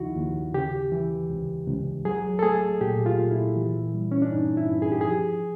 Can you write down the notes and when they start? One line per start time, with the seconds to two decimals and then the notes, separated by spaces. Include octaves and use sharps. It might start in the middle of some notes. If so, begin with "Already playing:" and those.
Already playing: D#2 C#3 F3 D#4 E4 F#4
0.16 D#2
0.54 C#3 G4
0.92 E3
1.30 C#2
1.67 C#2
2.05 F#3 G#4
2.39 A4
2.43 A3 G#4
2.81 A#2 G4
3.06 F4
3.19 A#2
3.31 E4
3.56 E3
3.95 G3
4.12 C#4
4.22 D4
4.32 G2 D#4
4.57 E4
4.69 G2
4.82 G#4
4.92 G4
5.01 G#4
5.07 F3